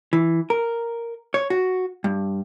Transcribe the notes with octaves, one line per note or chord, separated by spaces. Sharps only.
E3
A#4
C#5
F#4
G2